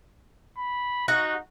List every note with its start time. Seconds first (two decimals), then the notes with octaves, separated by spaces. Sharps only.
0.58 B5
1.08 D#4 F#4 F#5 A#5